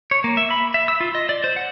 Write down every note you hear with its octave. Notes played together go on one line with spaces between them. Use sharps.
C#5
A#3
E5
B5
E5
E6
F4
D#5
D5
C5
F#5